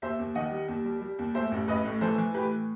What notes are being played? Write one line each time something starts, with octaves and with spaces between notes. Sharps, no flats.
D#2 C5 E5
D#2
D#3 D#5 F#5
G3
D#2
G3
G3
D#2
A2 C5 E5
A1
A1 B4 D#5
A2
E3 A4 C5
E3
A2 G4 B4